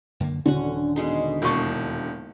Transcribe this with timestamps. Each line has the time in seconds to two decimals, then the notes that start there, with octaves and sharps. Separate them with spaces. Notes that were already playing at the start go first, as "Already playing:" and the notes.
0.20 F#2 D3 A#3
0.46 D#1 D3 C#4 F#4
0.96 B2 G#3 D#4
1.42 E1 A#3 D#5 A5 C#6